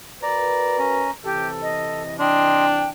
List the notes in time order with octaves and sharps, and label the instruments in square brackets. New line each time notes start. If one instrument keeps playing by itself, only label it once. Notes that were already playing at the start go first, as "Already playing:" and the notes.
[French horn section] F#4 A#4 B4 [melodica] D5 A#5
[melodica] C#4 A#5
[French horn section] C3 E3 [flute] G4 [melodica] A4
[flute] D#5
[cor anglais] D4 [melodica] D#5 C6 [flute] G5